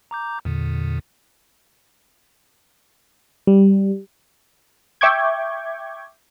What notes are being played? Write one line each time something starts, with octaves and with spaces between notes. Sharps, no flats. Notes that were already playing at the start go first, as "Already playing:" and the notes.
A#5 D6 G6
E2 A#2 D3
G3
E5 G5 C#6 D6 G6 G#6